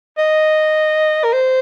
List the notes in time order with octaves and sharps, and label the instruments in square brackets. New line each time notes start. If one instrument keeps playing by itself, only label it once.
[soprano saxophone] D#5
A#4
C5